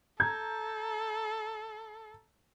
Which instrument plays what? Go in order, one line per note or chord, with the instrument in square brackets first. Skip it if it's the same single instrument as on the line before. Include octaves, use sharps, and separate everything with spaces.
[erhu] A4 [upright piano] A#5 G6 G#6